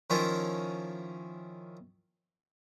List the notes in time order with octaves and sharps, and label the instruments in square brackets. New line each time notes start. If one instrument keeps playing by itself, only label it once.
[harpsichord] D#3 F3 C#4 E4 F4 A#4